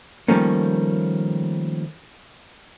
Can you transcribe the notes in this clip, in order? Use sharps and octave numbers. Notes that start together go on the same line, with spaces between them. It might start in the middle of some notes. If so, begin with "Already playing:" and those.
D#3 F3 G3 A3 A#3 C#4